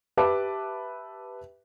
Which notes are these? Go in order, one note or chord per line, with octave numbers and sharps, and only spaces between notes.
G4 B4 E5 A5 D6